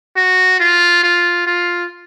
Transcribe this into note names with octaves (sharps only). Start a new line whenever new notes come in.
F#4
F4
F4
F4